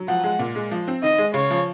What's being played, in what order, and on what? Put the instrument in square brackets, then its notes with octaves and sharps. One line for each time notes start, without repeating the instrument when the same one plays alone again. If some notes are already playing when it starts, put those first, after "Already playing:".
Already playing: [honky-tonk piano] F#3
[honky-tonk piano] F3 [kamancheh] F#5
[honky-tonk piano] G#3
A#2
G#3
F3
C4
[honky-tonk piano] D#3 [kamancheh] D#5
[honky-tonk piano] G#3
[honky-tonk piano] C#3 [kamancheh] C#5
[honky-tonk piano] F3